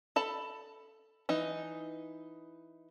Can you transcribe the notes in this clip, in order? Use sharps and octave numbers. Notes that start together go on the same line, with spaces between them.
A4 A5 B5
E3 D#4